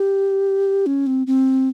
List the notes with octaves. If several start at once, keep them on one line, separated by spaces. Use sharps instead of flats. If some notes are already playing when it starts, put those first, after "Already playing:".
Already playing: G4
C#4
C4
C4